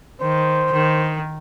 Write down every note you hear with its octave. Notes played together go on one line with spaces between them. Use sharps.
D#3 C5
D#3